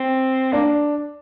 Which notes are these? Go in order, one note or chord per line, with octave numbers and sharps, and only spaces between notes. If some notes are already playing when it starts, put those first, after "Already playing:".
Already playing: C4
A#3 D4